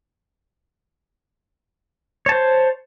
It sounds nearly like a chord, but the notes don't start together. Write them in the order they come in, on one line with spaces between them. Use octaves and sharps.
C#5 A5 C5